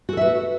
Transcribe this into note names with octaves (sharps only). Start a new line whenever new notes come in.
F#4 A4 B4 E5